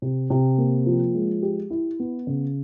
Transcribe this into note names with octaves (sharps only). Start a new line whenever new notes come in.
C3
C3
A#3
F3
G#3
G4
E4
B3
C#3